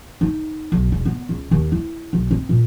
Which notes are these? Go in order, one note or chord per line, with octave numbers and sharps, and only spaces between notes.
D#4
B1
E1
B3
C#2
D#2
E4
B1
C4
A#2